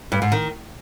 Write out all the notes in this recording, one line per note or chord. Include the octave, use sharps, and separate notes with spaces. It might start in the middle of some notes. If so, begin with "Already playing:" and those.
G2
G#2
D#3